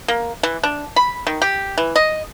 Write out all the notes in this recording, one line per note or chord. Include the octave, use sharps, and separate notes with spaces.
A#3
E3
D4
B5
D#3
G4
E3
D#5